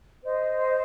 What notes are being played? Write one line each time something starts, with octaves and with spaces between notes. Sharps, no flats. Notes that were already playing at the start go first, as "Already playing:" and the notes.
C5 D#5